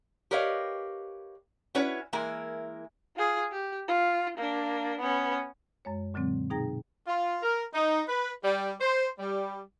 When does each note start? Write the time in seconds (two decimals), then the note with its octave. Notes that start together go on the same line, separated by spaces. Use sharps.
0.31 G4 A#4 B4 C#5 D#5 F5
1.75 C#4 E4 F#4 B4 C#5
2.13 E3 G#3 A#3 E4 A#4
3.16 F4 G#4
3.52 G4
3.88 F4
4.37 A#3 D4
4.99 B3 C#4
5.85 F#2 G#3 C#5
6.14 A#2 D3 F#3 G#3 C4
6.50 B2 D#4 G#4 G5 A#5 A#6
7.07 F4
7.43 A#4
7.74 D#4
8.08 B4
8.44 G3
8.80 C5
9.19 G3